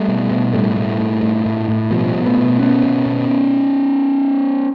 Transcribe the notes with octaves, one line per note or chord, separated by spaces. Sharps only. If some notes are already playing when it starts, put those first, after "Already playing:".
Already playing: G3 A3
B2
B2
A2 G3 A3
A2
A2
A2
A2
A2
B2 F3 G3
B2
A3 B3
B2
B2 B3 C#4
B2
B2